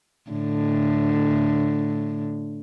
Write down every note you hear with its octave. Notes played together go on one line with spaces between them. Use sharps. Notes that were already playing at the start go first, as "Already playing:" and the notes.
A2 D3